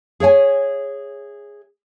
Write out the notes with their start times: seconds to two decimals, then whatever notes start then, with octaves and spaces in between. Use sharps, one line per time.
0.20 G#4 C#5 E5 G#5